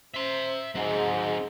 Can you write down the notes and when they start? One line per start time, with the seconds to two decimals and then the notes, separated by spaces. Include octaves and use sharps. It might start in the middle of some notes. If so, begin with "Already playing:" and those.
0.14 C5 E5 C6
0.75 G#2 F#3 C4 G#4